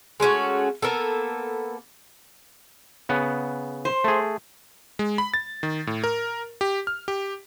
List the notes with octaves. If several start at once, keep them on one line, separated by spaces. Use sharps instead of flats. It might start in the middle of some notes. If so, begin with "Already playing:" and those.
G#3 A3 C#4 F#4
A#3 B3 A4
C#3 B3 F#5
C5
A3 G#4
G#3
B5
A6
D#3
A2
A#4
G4
F6
G4